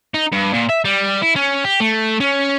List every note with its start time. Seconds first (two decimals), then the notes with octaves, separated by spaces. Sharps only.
0.14 D#4
0.32 G2
0.53 A#2
0.69 E5
0.85 G3
1.22 E4
1.36 C#4
1.64 G4
1.80 A3
2.20 C#4